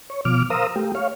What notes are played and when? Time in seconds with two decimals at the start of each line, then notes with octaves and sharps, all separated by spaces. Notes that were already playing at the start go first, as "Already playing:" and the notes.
0.10 C#5
0.25 B2 F3 D6 F6
0.50 A#4 C5 F5 A#5 D#6 E6
0.76 A3 G4
0.95 C#5 F5